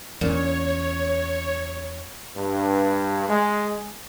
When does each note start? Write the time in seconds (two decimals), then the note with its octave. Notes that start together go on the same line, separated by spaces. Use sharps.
0.21 E2 A#2 B3 C#4 C#5
2.36 G2
3.29 G#3